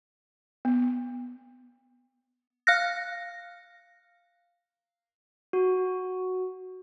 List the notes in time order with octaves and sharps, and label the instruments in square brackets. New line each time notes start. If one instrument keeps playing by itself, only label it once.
[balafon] B3
[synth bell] F5 F6 F#6 A#6
[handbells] F#4